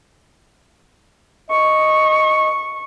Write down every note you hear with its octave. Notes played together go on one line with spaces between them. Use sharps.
D#5 C#6